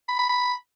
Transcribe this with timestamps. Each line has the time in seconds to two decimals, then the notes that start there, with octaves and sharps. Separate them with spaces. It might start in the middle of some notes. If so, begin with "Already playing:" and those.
0.08 B5
0.19 B5
0.29 B5